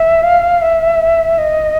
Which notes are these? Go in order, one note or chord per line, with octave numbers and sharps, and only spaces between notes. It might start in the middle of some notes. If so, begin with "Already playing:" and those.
Already playing: E5
F5
E5
D#5